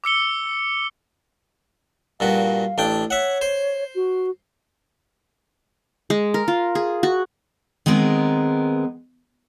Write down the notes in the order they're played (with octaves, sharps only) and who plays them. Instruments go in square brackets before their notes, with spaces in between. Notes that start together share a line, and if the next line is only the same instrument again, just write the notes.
[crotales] D6 E6 C#7 G7
[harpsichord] G2 A#2 F#4 [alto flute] F5
[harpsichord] A1 D4 G5
[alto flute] C#5 [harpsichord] E5 F#5
[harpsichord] C5
[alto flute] F#4
[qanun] G#3
A#4
F4
G#4
F#4
[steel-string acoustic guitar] D#3 G#3 B3 C4 A#4